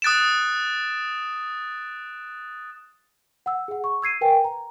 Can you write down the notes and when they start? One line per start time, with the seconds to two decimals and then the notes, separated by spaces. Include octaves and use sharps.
0.02 D#6 F#6 A6 D7 E7
3.46 F#5 E6
3.68 G#4 F#5
3.84 C#6
4.02 E6 G#6 C7 D#7
4.21 A#4 B4 G5 G#5
4.44 A#5